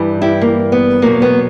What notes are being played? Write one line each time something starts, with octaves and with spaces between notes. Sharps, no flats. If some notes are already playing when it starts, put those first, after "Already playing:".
Already playing: G2 E3 G3
E4 G4
A#3
B3
E2 B2 F#3 A#3
B3